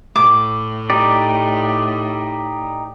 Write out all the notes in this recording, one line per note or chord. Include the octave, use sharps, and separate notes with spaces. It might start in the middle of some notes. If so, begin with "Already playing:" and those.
A2 D6
D#4 G4 D5